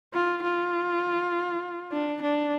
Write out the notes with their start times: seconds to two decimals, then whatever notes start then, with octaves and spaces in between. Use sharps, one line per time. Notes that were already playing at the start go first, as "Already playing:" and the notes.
0.13 F4
0.43 F4
1.92 D4
2.22 D4